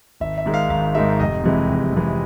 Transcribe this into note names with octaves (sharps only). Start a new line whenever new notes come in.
G#1 E5
E5
G#2 D#3 G#3
F5
G#1 F5
G#2 D#3 G#3 E5
F1 D#5
F2 C3 E3 G#3
F1
F2 C3 E3 G#3